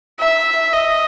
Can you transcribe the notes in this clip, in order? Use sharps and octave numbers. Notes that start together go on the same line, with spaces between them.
E5
D#5